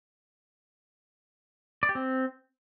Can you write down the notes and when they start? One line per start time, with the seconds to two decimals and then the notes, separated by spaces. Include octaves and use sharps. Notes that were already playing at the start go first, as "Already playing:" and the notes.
1.83 D5
1.89 G4
1.95 C4